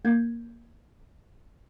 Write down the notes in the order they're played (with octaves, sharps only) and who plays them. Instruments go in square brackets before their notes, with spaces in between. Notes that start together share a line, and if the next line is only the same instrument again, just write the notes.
[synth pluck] A#3 G6 G#6